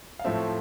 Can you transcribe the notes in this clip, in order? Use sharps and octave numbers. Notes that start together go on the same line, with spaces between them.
F5
A2 F3 A3 C4 E5